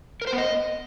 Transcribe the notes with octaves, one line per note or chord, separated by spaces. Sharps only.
A#4
C5
B3
D#5